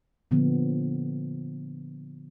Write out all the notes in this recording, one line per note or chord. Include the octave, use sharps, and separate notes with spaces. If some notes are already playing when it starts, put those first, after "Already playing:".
A#2 D3 F3 B3